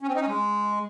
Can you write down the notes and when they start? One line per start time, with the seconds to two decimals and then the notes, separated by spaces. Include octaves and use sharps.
0.01 C#4
0.08 C4
0.14 D#4
0.21 C#4
0.27 G#3